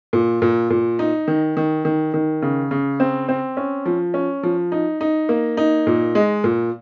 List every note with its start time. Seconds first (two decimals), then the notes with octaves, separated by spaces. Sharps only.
0.13 A#2
0.42 A#2
0.70 A#2
0.99 D#4
1.28 D#3
1.57 D#3
1.85 D#3
2.14 D#3
2.42 C#3
2.71 C#3
3.00 C4
3.29 C4
3.57 C#4
3.86 F3
4.14 C#4
4.43 F3
4.72 D#4
5.01 D#4
5.29 A#3
5.57 D#4
5.87 A#2
6.15 G#3
6.44 A#2